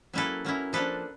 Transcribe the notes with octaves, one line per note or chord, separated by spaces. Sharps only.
F#3 A#3 C#4 E4 A4 B4
F#3 A#3 C#4 E4
F3 A#3 D4 A4 B4